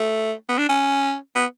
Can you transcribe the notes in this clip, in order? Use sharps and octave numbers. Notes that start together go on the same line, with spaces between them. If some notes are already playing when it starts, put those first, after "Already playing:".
Already playing: A3
B3
D4
C#4
B3